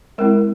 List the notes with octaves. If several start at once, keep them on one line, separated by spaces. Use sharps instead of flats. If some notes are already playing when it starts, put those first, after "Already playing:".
G#3 C4 E4 A#4